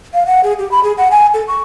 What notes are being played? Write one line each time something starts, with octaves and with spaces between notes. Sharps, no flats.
F5
F#5
G#4
G4
B5
G#4
F#5
G#5
A4
C#6